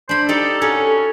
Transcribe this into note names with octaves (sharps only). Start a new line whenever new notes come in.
D4 C5 B5
D#4 G4 A4 D5
C#4 F#4 A4 A#4